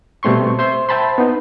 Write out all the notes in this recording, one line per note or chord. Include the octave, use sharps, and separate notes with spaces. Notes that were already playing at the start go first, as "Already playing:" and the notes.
B2 G3 A3 C4 C6 C#6
C5 E5 C6
C5 E5 G5 A5 B5 C6
B3 D#4